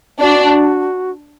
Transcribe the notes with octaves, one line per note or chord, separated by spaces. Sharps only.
D4 F#4